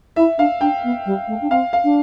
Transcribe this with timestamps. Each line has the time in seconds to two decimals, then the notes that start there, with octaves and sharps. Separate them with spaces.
0.16 E4 E5
0.38 D4 F5
0.61 D4 G5
0.84 B3
1.06 G3
1.28 A3
1.41 D4
1.50 C4 F5
1.73 F5
1.84 D4